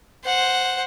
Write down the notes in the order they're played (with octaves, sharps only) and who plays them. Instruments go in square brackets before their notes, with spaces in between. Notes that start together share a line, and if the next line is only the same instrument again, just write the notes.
[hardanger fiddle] C5 F#5